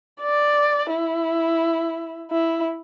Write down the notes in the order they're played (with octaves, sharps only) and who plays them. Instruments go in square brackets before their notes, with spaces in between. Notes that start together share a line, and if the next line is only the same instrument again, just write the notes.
[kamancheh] D5
E4
E4